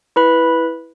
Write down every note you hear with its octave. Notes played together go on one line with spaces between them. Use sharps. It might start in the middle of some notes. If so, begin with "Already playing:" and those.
E4 B4 B5